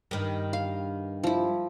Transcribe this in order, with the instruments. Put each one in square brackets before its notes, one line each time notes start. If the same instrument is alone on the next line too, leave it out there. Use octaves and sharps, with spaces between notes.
[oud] G2 D#3
[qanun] F5
F3 E4